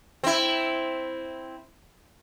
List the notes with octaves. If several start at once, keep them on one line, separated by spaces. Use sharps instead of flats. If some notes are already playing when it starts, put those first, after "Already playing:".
C4 E4